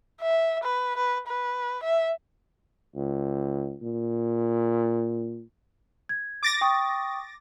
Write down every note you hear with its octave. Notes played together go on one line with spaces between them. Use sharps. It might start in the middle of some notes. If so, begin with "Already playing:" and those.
E5
B4
B4
B4
E5
C#2
A#2
G#6
D6 A6 A#6
G5 C#6 D#6